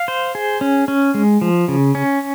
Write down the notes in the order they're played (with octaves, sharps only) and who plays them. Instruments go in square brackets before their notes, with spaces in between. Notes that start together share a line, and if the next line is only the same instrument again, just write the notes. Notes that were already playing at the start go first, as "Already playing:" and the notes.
Already playing: [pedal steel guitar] F5
C5
G#4
C#4
C#4
G#3
F3
C#3
C#4